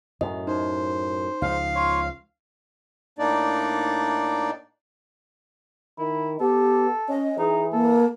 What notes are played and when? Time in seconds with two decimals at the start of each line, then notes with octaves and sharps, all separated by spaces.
0.21 F#2 A2 D#5
0.47 D#4 C5
1.42 C#2 F3 F5
1.75 F4 C#5
3.19 A2 A#3 D4 D#4 D5
5.99 D#3 E4
6.40 B3 G4 A4
7.09 C#4 D#5
7.39 E3 D#4 G#4
7.73 A#3 A4